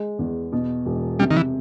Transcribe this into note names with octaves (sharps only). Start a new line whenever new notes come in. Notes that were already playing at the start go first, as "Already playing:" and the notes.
Already playing: G#3
E2
B2
E1
C3 G3
D#3
E3